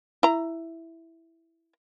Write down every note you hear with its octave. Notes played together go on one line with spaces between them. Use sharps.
E4 A#5